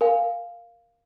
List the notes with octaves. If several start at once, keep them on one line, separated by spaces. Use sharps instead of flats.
A#4 F5 G#5